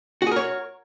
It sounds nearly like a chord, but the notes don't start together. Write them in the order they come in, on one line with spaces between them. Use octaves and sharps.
F#4 G#4 A#4 C#5